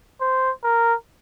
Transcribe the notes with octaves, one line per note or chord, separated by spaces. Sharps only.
C5
A#4